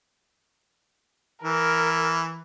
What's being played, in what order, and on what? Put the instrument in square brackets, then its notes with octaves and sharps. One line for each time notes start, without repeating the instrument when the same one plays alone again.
[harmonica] E3 [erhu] A#4